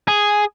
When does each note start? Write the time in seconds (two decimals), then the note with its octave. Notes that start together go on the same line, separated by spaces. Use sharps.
0.08 G#4